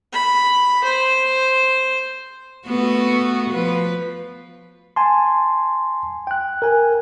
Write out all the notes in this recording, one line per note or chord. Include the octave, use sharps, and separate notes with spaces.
B5
C5
A3 B3 F#4
F3 B4
G#5 A5 C6
G5 F#6
A#4 G#5